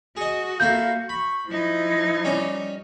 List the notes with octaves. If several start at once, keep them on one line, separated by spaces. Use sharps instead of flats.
F#4 G#4 D#5
A#3 E4 A4 F5 G6
B5 C#6
F3 D#4 E4
G3 C#4 D6